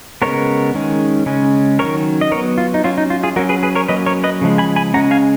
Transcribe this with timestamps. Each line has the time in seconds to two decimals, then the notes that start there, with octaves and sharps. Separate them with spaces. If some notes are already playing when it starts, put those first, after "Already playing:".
0.22 C#3 G#3 B3 A#4 C#5
0.74 D#3 G#3 C#4
1.26 C#3 G#3 C#4
1.79 D#3 F#3 C#4 A#4 C#5
2.21 D#5
2.32 F#3 A#4 C#5
2.35 B3
2.58 F4
2.74 D#4
2.84 F#3 C#4 F4
2.98 D#4
3.10 F4
3.23 F4 G#4
3.36 F#3 C#4 F#4 A#4
3.49 G#4 B4
3.63 G#4 B4
3.75 A#4 C#5
3.88 F#3 A#3 C#4 B4 D#5
4.06 A#4 C#5
4.24 B4 D#5
4.41 C#3 F3 G#3
4.58 G#5 B5
4.76 G#5 B5
4.94 C#3 G#3 C#4 F#5 A#5
5.11 F5 G#5